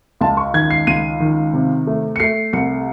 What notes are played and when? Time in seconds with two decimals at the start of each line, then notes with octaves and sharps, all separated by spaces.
0.21 C#2 A5
0.37 C#6
0.54 D#3 G#6
0.70 C7
0.87 C#2 D#7
1.20 D#3
1.53 C3
1.87 A3
2.16 C#7
2.20 A3 C7
2.53 C2 C#7